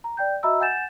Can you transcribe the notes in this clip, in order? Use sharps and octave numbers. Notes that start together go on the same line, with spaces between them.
A#5
D5 G5 G6
F#4 D#5 E5 A#5 B5 E6
F#5 G#5 G6 A6 E7